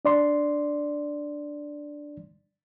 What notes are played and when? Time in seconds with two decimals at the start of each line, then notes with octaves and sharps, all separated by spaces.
0.05 D4 D5 C6